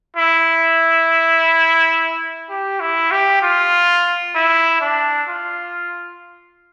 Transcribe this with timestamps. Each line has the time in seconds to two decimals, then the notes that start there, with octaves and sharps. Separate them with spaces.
0.17 E4
2.49 G4
2.80 E4
3.12 G4
3.43 F4
4.35 E4
4.81 D4
5.28 F4